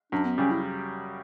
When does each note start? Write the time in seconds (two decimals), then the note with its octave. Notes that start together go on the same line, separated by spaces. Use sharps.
0.12 F#2 D4
0.25 B3
0.38 C#3 G3 C#4
0.51 E4